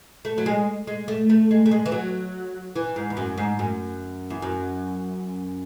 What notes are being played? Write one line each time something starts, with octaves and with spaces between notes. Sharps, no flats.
A3
F#3
G#3
G#3
A3
A3
G#3
A3
G#3
E3
F#3
E3
G#2
E2
F#2
G#2
F#2
E2
F#2